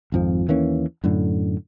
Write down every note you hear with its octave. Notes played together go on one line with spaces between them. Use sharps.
G#1 F2 F3
D#2 E3 A#3 C#4
F#2 A2 D3